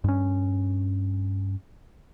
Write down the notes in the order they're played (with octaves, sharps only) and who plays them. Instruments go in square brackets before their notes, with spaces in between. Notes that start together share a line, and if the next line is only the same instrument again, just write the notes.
[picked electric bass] G2 C#4